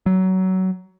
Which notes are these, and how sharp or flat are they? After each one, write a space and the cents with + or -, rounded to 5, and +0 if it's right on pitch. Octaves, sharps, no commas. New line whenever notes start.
F#3 +20